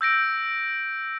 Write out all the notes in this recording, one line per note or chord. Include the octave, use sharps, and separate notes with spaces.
E6 G6 A#6 D7